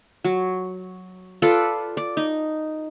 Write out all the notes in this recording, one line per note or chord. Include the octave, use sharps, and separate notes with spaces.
F#3
F4 A4 B4 D5
D5
D#4